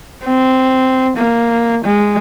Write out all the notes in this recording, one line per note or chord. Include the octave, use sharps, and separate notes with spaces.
C4
A#3
G#3